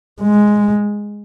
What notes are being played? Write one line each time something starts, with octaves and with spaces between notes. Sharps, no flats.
G#3